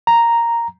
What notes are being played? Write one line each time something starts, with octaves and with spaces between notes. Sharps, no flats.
A#5